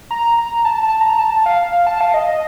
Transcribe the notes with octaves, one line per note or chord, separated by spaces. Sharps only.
A#5
A#5
A5
A5
A#5
A5
F5
F5
A5
F5
D#5
D#5